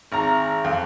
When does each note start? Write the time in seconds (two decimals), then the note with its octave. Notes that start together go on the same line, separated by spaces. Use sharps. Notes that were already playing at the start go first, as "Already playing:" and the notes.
0.12 G#1 A#5
0.64 F2